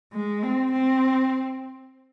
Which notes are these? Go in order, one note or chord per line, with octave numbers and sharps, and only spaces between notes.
G#3
C4
C4